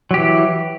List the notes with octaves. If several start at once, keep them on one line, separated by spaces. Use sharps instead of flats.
E3 F#3 G4